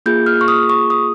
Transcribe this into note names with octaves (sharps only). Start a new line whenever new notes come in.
A#3 F4 G#4 G6
F6
C#6
D#6
C#6
D#6